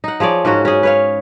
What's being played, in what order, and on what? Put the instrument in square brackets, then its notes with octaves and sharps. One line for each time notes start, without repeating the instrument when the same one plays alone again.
[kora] D#4 F#5
F3 G#4 C#5 D5
G#2 A#3 C#4 F#4
C#4 G#4
B4 C#5 F5